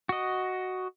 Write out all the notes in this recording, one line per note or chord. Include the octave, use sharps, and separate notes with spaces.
F#4 D#5